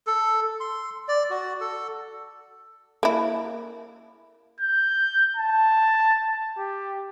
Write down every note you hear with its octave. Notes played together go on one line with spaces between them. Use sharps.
A4
C6
D5
F#4
A4
A#3 E4
G6
A5
G4